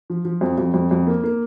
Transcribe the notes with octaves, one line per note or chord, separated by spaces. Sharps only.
F3
F3
F2
F2
F2
F2
A#3
A#3